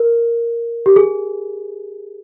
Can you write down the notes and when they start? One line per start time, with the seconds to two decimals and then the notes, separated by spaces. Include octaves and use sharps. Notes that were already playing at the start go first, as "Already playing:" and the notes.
Already playing: A#4
0.86 G4
0.96 G#4